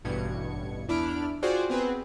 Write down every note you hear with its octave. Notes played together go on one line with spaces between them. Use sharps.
A1 G2 B2 G#6 C#7
E2 D4 E4 B5 F6 D7
F4 F#4 G#4 C5 D5 G5
B3 C4 G#4 B4